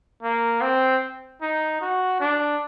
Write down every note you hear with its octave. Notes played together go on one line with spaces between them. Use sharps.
A#3
C4
D#4
F#4
D4